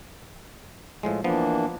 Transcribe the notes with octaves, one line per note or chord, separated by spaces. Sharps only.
A2 F3 G#3
E3 F3 A#3 B3 D4